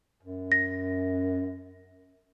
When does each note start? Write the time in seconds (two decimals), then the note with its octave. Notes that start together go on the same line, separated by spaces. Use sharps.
0.23 F#2
0.52 A#6